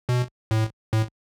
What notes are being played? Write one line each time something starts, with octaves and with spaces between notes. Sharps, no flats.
B2
A2
A2